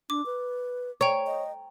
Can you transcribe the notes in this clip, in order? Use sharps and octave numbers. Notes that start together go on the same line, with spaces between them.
D4 D6
B4
C#5 G5 A#5
D#5